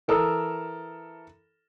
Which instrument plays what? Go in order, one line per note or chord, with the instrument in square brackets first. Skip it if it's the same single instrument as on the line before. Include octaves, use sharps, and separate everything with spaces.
[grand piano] E3 A4 A#4 D#6 E6